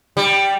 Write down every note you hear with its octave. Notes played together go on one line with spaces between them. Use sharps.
G3